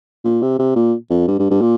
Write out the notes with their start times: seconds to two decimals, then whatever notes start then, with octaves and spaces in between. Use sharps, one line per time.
0.25 A#2
0.42 C3
0.59 C3
0.75 A#2
1.10 F2
1.28 G2
1.39 G2
1.50 G2
1.61 A#2